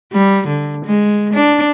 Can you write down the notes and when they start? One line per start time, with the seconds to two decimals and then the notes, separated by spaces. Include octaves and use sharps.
0.12 G3
0.47 D3
0.85 G#3
1.34 D4